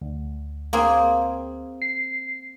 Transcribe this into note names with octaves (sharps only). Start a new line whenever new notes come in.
D2
A#3 C4 G#4
C7